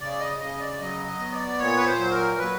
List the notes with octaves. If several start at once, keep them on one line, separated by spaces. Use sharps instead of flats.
C#3 D5
D#5
C#3 D#5
D5
F#3 D#5
D#5
B3
D5
A#2 C#5
B4
C5
F#3
A#4
F#3 B4